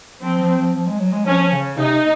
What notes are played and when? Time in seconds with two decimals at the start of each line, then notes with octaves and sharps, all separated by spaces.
0.21 F3 C4
0.38 F3
0.56 F3
0.73 F3
0.87 G#3
0.99 F#3
1.12 G#3
1.25 F3 C#4
1.52 C#3
1.78 C3 D#4